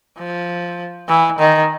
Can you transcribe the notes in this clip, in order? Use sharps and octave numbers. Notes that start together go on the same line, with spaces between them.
F3
E3
D#3